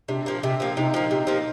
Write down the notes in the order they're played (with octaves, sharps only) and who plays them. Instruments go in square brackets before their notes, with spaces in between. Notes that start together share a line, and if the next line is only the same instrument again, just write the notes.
[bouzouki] C3 [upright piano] D4
[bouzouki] F3 A#3
C3
F3 A#3
[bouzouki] C3 [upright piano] D#4
[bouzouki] F3 A#3
C3
F3 A#3